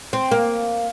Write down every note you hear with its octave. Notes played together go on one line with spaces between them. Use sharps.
C4
A#3